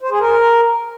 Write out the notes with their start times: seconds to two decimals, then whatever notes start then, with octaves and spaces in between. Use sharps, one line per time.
0.01 C5
0.10 G#4
0.20 A#4